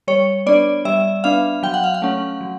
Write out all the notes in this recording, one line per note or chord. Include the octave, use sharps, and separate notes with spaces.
G3 C#5
B3 D4 D5
G3 E5
B3 D4 F5
F#3 G5
F#5
F5
F#5
A3 C#4
F#3